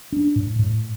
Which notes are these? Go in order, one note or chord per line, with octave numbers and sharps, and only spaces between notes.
D4
A2
A2